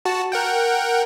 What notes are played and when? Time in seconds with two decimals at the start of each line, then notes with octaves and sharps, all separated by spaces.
0.05 F#4 A5
0.32 A#4 F#5 G5